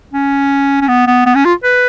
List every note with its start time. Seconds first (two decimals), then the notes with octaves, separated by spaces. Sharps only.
0.13 C#4
0.81 C#4
0.88 B3
1.07 B3
1.26 B3
1.35 C#4
1.45 F4
1.64 B4